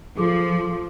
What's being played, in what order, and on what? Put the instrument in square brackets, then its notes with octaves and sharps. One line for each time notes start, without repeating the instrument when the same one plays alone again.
[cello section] F3 [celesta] G#4 A4 D6